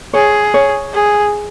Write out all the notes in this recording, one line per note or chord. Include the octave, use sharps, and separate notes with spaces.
G#4 C#5
C#5
G#4